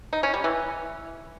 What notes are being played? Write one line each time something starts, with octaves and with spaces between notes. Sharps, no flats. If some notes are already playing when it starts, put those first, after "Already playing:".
D#4
C#4
G3
E3